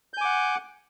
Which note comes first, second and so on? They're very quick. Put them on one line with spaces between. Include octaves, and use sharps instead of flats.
G6 G#5 D6 F#5